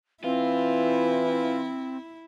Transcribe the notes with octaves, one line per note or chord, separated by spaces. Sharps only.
E3 C4 E4 F4